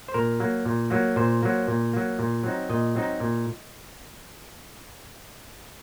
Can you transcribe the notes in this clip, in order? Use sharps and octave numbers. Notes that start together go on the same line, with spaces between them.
C5
A#2 A#4
F#3 A#3
A#2
F#3 A#3
A#2 C5
F#3 A#3
A#2
F#3 A#3
A#2
F#3 C4 D#4
A#2 D#5
F#3 C4 D#4
A#2